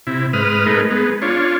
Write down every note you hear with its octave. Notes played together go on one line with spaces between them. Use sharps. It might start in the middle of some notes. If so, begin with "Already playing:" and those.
C3 E4
G#2 B4 D#6 F6
G#3 A3 D#4 A#4 B4
G#3 B3
D4 F4 C#5